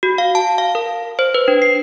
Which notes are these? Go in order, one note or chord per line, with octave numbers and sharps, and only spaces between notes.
F#4
F5
A5
F5
A#4
C5
B4
D4
C7